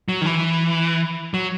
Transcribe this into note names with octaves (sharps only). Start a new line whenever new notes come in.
F#3
D#3
E3
F#3